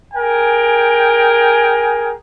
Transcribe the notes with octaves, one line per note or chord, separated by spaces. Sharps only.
G#4 A#4 G5 G#5